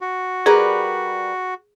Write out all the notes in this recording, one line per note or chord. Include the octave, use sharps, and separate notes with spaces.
F#4
G3 G#4 A#4 B4